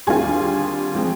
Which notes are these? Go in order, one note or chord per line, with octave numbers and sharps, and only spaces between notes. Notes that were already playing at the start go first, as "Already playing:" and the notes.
D#2 D3 G3 C4 F4 G#4 G#5
F3 G#3 C4